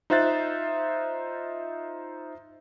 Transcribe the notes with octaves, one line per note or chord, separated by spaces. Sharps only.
D#4 F4 C5 E5 F#6 A6